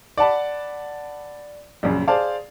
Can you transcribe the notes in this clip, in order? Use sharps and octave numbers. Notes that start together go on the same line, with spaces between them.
D5 F#5 A5 B5
A#1 F#2 C#3
G#4 C5 D5 F5 A5